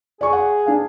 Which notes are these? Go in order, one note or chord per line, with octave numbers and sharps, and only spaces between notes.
G#4 D5 C#6
F#5
D4 F5